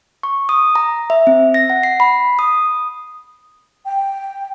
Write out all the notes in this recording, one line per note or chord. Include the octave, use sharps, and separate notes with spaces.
C#6
D#6
A#5
E5
C4
A#6
F#5
C7
B5
D#6
G5